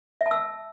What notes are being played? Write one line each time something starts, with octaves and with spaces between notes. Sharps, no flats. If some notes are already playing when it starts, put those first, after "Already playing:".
E5
A5
E6